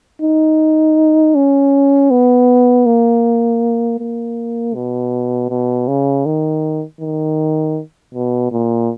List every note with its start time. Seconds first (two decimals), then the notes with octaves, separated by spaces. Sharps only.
0.22 D#4
1.35 C#4
2.11 B3
2.86 A#3
3.99 A#3
4.75 B2
5.50 B2
5.88 C#3
6.26 D#3
7.01 D#3
8.14 B2
8.52 A#2